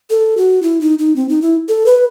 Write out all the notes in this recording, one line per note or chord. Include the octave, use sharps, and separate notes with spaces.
A4
F#4
E4
D#4
D#4
C4
D#4
E4
A4
B4